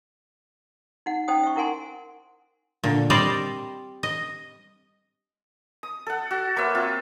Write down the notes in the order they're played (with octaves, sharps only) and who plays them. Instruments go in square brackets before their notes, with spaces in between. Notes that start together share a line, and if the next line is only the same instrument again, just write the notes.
[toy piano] D#4 F#5
C#4 D#4 C5 G5 D#6
E5 C#6
D#4 E4 A#4 F#5 G#5 C6
[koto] A#2 D3
G3 C4 C5 D5 D#5
D#5
[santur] D#6
A4 F#5
F#4
A#3 B4 C#5 E5
C4 F4